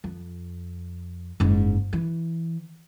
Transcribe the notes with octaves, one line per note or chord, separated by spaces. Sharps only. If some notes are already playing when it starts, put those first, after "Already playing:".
F2
F#1 G#2
E3